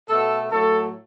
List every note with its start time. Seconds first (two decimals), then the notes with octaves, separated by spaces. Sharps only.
0.08 B2 A3 A4
0.50 A2 F#3 A3 A4